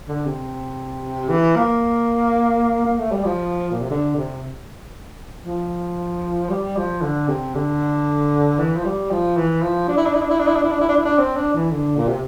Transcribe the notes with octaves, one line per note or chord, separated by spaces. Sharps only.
D3
C3
E3
A#3
A#3
A3
G3
F3
A#2
C3
D3
C3
F3
G3
F3
D3
C3
D3
E3
F3
G3
F3
E3
F3
D4
E4
D4
E4
D4
E4
D4
E4
D4
E4
D4
E4
D4
E4
D4
C4
D4
E3
D3
A#2
C3